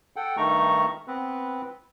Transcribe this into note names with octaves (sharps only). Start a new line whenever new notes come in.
A4 F#5 G5
G2 D#3 A3 D#4 A#5 C#6
B3 C4 B4